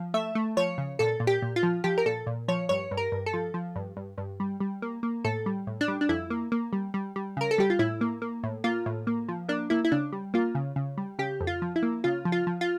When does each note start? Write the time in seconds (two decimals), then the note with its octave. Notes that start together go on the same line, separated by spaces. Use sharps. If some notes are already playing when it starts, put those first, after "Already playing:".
Already playing: F3
0.14 A3 E5
0.35 A3
0.57 F3 C#5
0.78 C#3
0.99 A#2 A4
1.20 A#2
1.27 G4
1.42 A#2
1.56 F4
1.63 F3
1.84 F3 G4
1.98 A#4
2.06 A#2 A4
2.27 A#2
2.48 F3 C#5
2.69 G2 C#5
2.91 G2
2.97 A#4
3.12 G2
3.26 A4
3.33 F3
3.54 F3
3.76 G2
3.97 G2
4.18 G2
4.40 G3
4.60 G3
4.82 A#3
5.03 A#3
5.25 A2 A4
5.46 G3
5.67 A2
5.81 D4
5.88 G3
6.01 D4
6.09 F2 E4
6.30 A#3
6.52 A#3
6.73 G3
6.94 G3
7.16 G3
7.37 C#3 A#4
7.51 A4
7.58 G3 G4
7.70 F4
7.79 A2 E4
8.01 A#3
8.22 A#3
8.44 A2
8.64 A#3 F4
8.86 A2
9.07 A#3
9.29 F3
9.49 A#3 D4
9.70 A#3 E4
9.84 E4
9.92 C#3 D4
10.12 G3
10.34 A#3 F4
10.55 C#3
10.76 C#3
10.98 G3
11.19 C#3 G4
11.41 F2
11.47 F4
11.62 F3
11.76 E4
11.83 A#3
12.04 C#3 F4
12.25 F3
12.32 F4
12.47 F3
12.61 F4